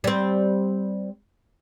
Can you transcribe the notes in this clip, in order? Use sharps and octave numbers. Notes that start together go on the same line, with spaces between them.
G3 C4